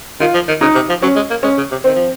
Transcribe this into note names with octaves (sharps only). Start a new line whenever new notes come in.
D#3 F4
F3
D#3
C#3 D#4
C3
F3
F#3 C#4
G#3
A#3
G#3 C#4
C#3
C3
D#3 C4
F3